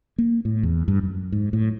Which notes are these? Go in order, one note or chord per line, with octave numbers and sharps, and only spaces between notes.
A#3
A2
E2
G2
F#2
G#2
A2